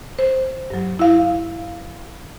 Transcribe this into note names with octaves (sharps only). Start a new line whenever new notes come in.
C5
G2 F#3
E4 F5